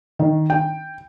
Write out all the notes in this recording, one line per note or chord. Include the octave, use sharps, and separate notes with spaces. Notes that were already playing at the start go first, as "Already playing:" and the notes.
D#3
G5